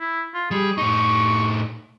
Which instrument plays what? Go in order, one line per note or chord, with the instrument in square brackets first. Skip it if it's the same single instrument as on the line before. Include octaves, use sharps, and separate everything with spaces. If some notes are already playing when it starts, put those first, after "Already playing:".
[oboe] E4
F4
[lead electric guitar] G3 [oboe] G#4
[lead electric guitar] A2 D#4 [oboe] C#6